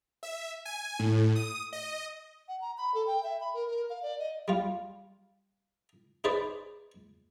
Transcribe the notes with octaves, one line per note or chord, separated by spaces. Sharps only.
E5
G#5
A2
D#6
D#5
F#5
A#5
B5
A4
G5
E5
B5
A#4
A#4
F5
D5
D#5
G3 F4
D#4 G#4 B4 C5 D5